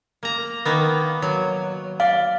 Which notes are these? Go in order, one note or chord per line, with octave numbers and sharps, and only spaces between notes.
A#3 A#5
D#3 A#3 B3
F#3
D5 F5